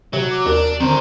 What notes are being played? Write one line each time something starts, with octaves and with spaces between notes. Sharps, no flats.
C3 F#3
D6
D#2 D4 A#4
D3 D#3 C4 D4 C5 A#5